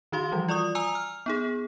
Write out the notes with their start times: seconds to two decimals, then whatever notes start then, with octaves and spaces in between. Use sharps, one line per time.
0.12 D#3 D#4 F#4 F5 C6
0.32 E3 F3 G3
0.49 F4 D5 C#6 D#6
0.75 G#5 A#5 D#6 E6 F7
0.95 F6
1.26 B3 D#4 G#4